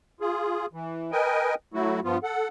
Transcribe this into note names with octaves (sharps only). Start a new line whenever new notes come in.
F4 G#4
E3
A#4 B4 D#5 G5 G#5
F#3 A3 E4 F#4
G2 F3 B3 F4
A4 F#5